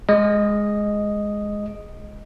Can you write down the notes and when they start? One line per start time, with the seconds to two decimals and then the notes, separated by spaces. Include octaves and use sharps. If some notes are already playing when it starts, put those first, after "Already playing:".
0.09 G#3 D#5